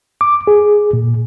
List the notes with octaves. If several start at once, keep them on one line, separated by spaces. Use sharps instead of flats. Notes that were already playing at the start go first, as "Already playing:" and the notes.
D6
G#4
A#2